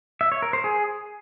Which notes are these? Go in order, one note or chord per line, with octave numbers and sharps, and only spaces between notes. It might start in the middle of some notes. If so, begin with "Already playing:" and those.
E5
C#5
A#4
C5
G#4